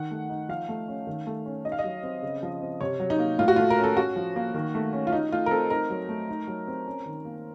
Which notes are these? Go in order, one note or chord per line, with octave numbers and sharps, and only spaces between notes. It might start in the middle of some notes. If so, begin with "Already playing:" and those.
Already playing: D#3 F#5
A3
D#4
F3 F5
A3
C#4
D#3
A3
C#4
D#4 D#5
F5
D#5
F#3
C4
C#3
F3
C4
C3 C#5
F#3
D#4
A#3
A2 F4
F#4
A3 F4
A#4
C#4
A4
C#4 F#4
F3
A#3
D#3
A3
C#4
F4
D#4
A3 F4
A#4
C4 A4
D#4 A#4
F#3
A3
D#4
F#3
C4
C#4
D#3
A#3